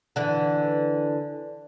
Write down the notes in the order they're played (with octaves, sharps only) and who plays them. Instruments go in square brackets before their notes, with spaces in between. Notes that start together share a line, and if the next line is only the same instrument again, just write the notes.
[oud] D3 E3